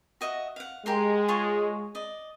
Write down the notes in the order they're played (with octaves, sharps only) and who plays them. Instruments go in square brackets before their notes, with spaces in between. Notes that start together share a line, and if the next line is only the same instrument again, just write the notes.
[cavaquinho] F#4 D#5 E5
F5 F#5
[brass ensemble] G#3 [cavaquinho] G4 A#4 C6
[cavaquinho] F4 G#4 C#5
D5 D#5